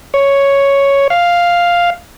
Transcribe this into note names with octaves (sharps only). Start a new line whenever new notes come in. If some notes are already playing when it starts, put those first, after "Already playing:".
C#5
F5